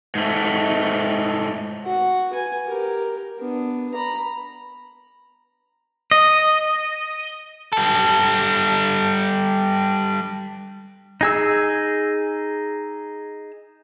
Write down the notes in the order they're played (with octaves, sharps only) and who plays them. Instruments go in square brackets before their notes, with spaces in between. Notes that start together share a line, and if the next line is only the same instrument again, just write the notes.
[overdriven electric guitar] G#2 A3
[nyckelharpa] F#4 F#5
B4 G#5
G4 A#4
B3 D4
A#5 B5
[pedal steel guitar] D#5
[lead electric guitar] G3 A4
[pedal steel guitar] D#4 G#4 E6